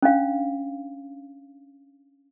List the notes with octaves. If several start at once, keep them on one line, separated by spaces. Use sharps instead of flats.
C#4 D4 F5